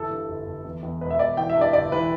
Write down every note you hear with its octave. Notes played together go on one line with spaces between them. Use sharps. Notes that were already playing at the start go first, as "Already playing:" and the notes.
Already playing: G1 E3 A4
G2
G1
G1
E2
E2
E1 B4
E5
E1 D5
E3 G5
E5
G2
D5
G1 D5
E3 B4